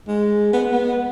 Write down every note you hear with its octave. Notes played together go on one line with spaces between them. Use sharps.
G#3
B3
B3